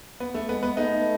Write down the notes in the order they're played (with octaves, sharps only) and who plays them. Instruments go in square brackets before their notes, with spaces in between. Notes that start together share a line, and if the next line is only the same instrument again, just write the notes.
[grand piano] B3
A3
[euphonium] G#3 [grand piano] B3
[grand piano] B3
[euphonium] A3 [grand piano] B3 D#4